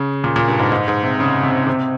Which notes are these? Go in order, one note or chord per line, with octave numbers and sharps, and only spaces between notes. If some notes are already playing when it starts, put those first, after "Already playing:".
Already playing: C#3
A#2
A#2
G2
G#2
G#2
G#2
C3
C#3
C3
C3